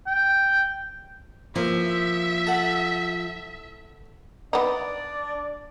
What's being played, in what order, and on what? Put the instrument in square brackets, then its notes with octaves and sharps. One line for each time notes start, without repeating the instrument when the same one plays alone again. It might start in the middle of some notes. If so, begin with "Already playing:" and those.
[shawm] G5
[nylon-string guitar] F3 [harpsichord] A#3 [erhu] E5
[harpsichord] A4 F#5
[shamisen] B3 D#4 [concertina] D4 [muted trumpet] D5